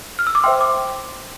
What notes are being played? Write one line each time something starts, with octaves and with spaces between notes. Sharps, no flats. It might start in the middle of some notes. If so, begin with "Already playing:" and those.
F6
E6
D6
C5 E5 G5 C6
D6